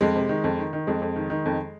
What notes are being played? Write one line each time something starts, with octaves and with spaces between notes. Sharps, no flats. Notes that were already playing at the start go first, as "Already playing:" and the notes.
F2 G#3
C3
D#3
F2
D#3
D#3
F2 G#3
F2
D#3
D#3
F2